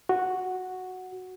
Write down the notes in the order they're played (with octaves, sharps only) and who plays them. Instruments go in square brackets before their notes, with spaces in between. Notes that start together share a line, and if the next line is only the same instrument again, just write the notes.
[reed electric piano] F#4